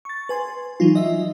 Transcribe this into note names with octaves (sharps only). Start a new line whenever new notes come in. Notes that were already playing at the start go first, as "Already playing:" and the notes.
C#6 A6
B4 G#5 C6
E3 F#3 D#4 F4
D#5 E5